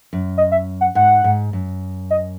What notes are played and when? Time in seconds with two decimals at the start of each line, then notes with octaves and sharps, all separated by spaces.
0.13 F#2
0.38 D#5
0.52 E5
0.81 F#5
0.95 G#2 F#5
1.24 G#2
1.53 F#2
2.11 D#5